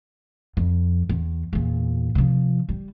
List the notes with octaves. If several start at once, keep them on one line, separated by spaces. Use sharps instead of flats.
F2
E2
E2 A#2
C3 F3
G3